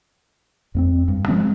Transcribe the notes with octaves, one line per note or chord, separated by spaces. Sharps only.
F2 A#3 C4
G2
F3 G#3 C4 C#4